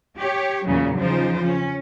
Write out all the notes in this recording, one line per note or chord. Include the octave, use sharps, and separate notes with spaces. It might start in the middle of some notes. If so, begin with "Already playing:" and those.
G4 C#5
E2 A#2 C#3 E3 F#3
C#3 F3 D#4 F4 C5
C#4